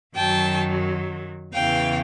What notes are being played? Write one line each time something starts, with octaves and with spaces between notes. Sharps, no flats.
F#2 D#3 F#3 G5 A5
E2 C#3 E3 F5 G5